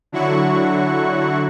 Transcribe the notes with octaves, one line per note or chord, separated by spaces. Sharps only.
D3 F#3 E4 F#4 F#5 C#6